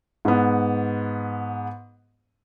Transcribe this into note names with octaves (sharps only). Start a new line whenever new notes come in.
G#2 B3